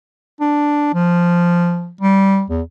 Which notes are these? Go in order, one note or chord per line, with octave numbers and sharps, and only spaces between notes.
D4
F3
G3
E2